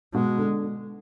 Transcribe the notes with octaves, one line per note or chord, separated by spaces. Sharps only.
B2 G#3
D3